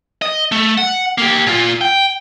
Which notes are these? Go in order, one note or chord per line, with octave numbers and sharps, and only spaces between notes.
D#5
A3
F#5
A#3 G4
A#2 F4
G5